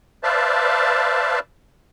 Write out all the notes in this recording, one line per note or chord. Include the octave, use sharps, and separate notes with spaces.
B4 C5 D5 E5 F5 A5